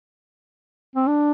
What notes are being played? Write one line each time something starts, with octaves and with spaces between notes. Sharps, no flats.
C4
D4